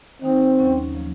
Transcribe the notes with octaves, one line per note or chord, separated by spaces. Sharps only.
D#3 A#3 C4 D#4
D#2 C#3 F#3 C#4 F#4
C#3 F3 A#3